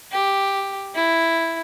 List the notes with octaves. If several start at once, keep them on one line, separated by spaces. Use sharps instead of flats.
G4
E4